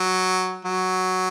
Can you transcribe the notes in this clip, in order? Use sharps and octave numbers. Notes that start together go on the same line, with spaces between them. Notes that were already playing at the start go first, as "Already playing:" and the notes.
Already playing: F#3
F#3